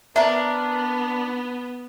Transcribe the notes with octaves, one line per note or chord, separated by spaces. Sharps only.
B3 D4 A#4 E5